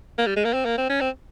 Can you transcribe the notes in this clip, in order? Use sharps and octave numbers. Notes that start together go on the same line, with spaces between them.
A#3
G3
G#3
A#3
C4
A#3
C4
C#4
C4